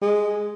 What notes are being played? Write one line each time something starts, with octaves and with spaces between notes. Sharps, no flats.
G#3